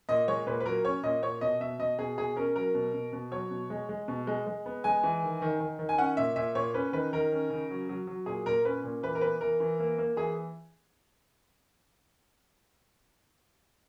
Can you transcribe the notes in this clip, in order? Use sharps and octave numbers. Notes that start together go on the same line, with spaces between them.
A#2 D#5
G#3 C#5
A#2 B4
B4
F#3 A#4
C#4 C#5
A#2 D#5
A#2 C#5
B2 D#5
B2 E5
B2 D#5
B2 G#4
B2 G#4
C#4 A#4
F#3 A#4
B2
B2
B2
F#3 C#5
B2
G#3
G#3
B2
G#3
G#3
B3
G#3 G#5
E3
D#3
D#3
D#3
D#3
G#5
C#4 F#5
A#2 E5
A#2 E5
A#2 C#5
C#4 B4
D#3 B4
D#3 A#4
C#4
C#3
F#3
F#3
F#3
A#2 G#4
A#2 A#4
C#4 B4
A#2
E3 B4
A#4
B3 B4
E3 A#4
E3
A#3
A#3
E3 G#4